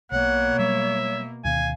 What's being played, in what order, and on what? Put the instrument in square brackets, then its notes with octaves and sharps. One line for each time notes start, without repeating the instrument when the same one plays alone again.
[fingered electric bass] B1 [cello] B2 A#3 [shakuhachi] C#5 [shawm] F#5
[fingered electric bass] F#3 G3 [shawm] E5
[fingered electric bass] D2 B2 D#3 [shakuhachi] F5 [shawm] G#5